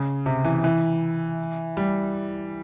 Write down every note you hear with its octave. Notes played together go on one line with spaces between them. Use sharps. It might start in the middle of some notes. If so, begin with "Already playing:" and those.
Already playing: C#3
C3
E3
E3
G3